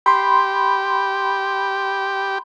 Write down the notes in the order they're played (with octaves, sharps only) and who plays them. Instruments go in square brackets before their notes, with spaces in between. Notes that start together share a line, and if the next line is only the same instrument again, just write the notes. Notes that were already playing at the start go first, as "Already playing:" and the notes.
[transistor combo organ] G4 [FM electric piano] B5 C6